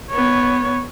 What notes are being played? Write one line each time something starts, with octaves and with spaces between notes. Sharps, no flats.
B3 C#5